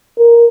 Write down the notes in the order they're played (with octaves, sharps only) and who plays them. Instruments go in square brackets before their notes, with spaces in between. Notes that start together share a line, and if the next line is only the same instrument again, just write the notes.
[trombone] A#4